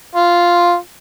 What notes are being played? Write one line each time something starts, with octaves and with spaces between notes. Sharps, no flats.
F4